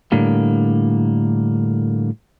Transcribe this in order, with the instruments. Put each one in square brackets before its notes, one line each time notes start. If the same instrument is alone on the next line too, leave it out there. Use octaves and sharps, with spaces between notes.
[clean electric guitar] A2 D3 G3 A#3